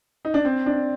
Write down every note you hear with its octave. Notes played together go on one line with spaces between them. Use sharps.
D#4
D4
C4
D4